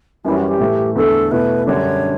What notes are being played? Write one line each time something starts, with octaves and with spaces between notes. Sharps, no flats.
F#2 E3 G3 C#4 E4
F#4
G4
A2 E3 A3 E4
E2 D3 A3 A4
B2 A3 E4 B4
F#2 D3 G3 D4 C#5